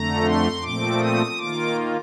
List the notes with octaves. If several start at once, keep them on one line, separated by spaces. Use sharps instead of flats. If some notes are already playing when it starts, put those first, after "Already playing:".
Already playing: F2 D3 A3 A#5
C6
A#2 F3 A3 C4 D6
D#6
D#3 A#3 F4 D6